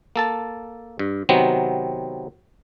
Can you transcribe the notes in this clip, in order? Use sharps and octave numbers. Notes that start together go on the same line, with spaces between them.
A#3 A4 A5
G2
C3 D#3 F#3 B3 C4